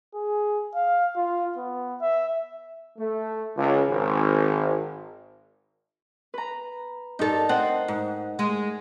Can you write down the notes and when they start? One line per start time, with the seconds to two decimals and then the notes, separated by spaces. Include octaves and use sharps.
0.15 G#4
0.75 F5
1.17 F4
1.57 B3
2.01 E5
2.98 A3
3.57 C#2
3.89 G#1
6.34 B4 A#5
7.19 G2 D#4 A4 A#4
7.49 C4 D#5 F#5
7.88 G#2
8.39 G#3